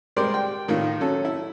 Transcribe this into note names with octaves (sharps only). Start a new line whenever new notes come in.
G3 G#3 G4 A#4 C5 D5
G5
A2 D#3 F4
F#3 C#4 A4
E4